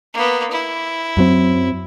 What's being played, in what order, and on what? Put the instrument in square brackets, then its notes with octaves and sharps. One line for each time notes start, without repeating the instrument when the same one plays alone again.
[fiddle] A#3 B3
E4
[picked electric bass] F#2 F#3 C4